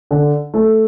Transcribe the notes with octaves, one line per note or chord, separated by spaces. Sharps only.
D3
A3